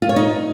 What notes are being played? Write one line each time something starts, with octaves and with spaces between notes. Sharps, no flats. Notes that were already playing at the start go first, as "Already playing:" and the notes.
F4
C#5
D#4